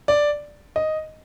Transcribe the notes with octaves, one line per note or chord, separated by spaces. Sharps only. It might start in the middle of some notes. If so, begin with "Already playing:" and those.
D5
D#5